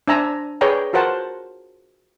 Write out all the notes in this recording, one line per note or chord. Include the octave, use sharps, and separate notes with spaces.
D4 C5 E5 G#5 A#5 E6
G#4 B4 C#5 D5 G5 A#5
F4 F#4 A#4 C5 F#5 A5